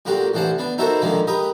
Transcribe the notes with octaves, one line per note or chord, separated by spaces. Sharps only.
A#2 D3 A#3 F#4 G4
A1 E3 D4 C5 F#5
B3 D4
D#4 E4 F#4 A4 A#4 C5
A#2 D3 D#3 F3 G#3 A#3
G4 A#4 B4 D#5 D#6